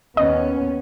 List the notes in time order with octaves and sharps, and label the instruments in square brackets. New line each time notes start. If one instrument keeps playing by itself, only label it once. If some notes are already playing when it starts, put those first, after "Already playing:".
[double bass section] D#2 B3 C#4 [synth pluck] D#5